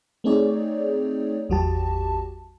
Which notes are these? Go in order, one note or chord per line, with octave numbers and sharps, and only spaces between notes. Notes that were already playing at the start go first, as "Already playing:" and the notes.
A3 C4 D#4 G#4 C#5 D5
G#1 E2 F#3 F#4 G4 A5